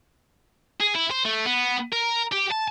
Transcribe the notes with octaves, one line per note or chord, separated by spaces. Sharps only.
G#4
E4
C5
A3
B3
A#4
G4
A5